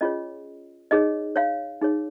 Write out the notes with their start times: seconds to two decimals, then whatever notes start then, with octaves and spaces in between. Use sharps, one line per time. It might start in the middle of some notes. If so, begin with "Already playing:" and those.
0.01 C#4 F4 G#4 C#5 D#5
0.91 D#4 G#4 C#5 D#5
1.36 C#5 F5
1.82 D#4 G#4 C#5